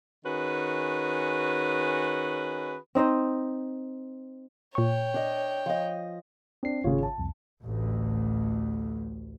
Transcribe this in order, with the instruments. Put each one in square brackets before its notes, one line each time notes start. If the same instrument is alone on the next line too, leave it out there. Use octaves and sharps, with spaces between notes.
[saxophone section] D#3 C#4 F#4 G#4 B4
[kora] C4 D#4 C5 D#5
[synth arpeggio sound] A#2 C#6 [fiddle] C#5 G5
[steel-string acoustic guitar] D4 D#5
F3 D#5
[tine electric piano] C4 C7 [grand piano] D4
[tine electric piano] G#1 C#5 [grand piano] C#3 F4
[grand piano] A5
[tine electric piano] C2 F2
[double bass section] A1 D2